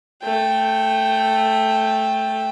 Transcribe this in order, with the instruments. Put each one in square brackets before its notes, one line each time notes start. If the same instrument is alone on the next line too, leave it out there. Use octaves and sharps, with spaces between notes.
[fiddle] A3 G5